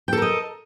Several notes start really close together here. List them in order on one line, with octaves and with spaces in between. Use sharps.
G5 A4 A#4 D#5